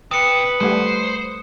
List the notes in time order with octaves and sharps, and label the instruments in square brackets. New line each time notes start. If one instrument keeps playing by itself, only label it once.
[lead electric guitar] C3 [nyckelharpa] B4 [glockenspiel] D#6 C#7
[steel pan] G3 A3 F#5 [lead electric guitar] C5